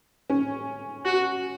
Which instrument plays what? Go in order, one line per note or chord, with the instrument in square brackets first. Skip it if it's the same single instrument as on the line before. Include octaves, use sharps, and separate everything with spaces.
[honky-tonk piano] C#4
[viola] F#4